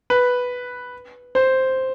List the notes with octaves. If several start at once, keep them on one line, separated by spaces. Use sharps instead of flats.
B4
C5